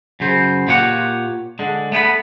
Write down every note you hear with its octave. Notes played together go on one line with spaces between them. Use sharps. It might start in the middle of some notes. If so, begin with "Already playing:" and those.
F#2 C#3 C5
A#2 F4 G4 C#5 F#5
D3 G#3
A3 B3 G5 B5